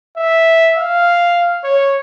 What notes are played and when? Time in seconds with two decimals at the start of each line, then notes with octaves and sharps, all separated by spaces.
0.17 E5
0.76 F5
1.64 C#5